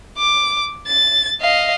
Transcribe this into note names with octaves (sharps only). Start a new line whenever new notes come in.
D6
A6
D#5 F5